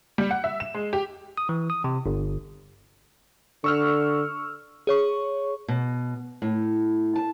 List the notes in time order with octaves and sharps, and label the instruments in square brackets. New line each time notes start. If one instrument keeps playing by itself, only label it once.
[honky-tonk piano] G3
F#5
E5
E7
G#3
G4
[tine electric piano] D#6
E3
D#6
C3
G1
[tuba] D3 [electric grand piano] C#6 E6 F6
[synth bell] G#4 C#5 C#6
[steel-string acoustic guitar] B2
A2
A5